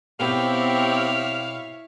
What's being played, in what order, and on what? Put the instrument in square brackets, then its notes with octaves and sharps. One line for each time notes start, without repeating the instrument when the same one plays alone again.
[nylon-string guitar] B2 B3 G5 [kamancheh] C4 G4 [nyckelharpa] E4 C#5 [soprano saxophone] F5